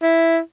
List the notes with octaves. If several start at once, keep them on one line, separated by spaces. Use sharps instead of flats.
E4